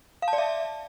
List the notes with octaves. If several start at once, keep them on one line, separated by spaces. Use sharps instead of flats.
F5
A5
D5
E5